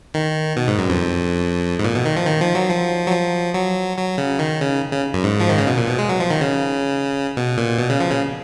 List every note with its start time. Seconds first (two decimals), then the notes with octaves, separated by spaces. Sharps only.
0.14 D#3
0.57 B2
0.68 G#2
0.78 F#2
0.89 F2
1.79 G#2
1.84 A#2
1.95 B2
2.05 D#3
2.16 F3
2.27 D#3
2.41 F3
2.55 F#3
2.70 F3
3.07 F#3
3.12 F3
3.54 F#3
3.97 F#3
4.18 C#3
4.39 D#3
4.60 C#3
4.92 C#3
5.13 F#2
5.24 G#2
5.40 F3
5.49 D#3
5.58 C#3
5.67 B2
5.77 A#2
5.88 B2
5.99 G#3
6.09 F#3
6.20 F3
6.30 D#3
6.41 C#3
7.37 B2
7.58 A#2
7.79 B2
7.90 C#3
8.00 F3
8.11 C#3